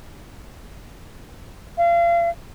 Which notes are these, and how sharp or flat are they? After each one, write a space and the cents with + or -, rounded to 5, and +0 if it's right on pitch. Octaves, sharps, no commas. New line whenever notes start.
F5 -35